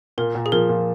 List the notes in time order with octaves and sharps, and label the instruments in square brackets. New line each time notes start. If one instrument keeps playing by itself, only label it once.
[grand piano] A#2 [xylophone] A#4
[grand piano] A#2
[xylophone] G#4
[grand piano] F3 [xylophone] A#4
[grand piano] A#2